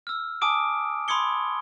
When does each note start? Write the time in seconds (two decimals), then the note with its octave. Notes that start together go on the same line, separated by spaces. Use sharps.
0.07 E6 F6
0.42 G#5 A5 D6 D#6 D7
1.08 B5 C6 D#6 G#6 C#7 G7